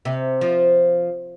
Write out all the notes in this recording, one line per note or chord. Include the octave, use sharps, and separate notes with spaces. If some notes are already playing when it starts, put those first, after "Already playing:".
C3
F3